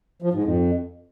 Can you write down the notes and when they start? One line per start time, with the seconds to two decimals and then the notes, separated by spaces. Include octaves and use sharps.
0.22 F3
0.33 G#2
0.44 F2